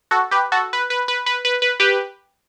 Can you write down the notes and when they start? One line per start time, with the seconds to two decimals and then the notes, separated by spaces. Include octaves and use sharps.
0.11 F#4 A4
0.31 G4 B4
0.52 F#4 A4
0.73 B4
0.90 B4
1.08 B4
1.26 B4
1.45 B4
1.62 B4
1.80 G4 B4